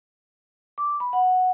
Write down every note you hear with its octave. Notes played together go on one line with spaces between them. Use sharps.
D6
B5
F#5